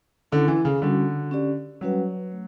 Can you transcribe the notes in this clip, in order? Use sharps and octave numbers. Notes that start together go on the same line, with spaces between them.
D3 C#4 E4 A4
E3
C#3
D3 G3 C#4 F#4
C#4 G4 D5
F#3 G3 C#4 F#4 B4 F#5
A3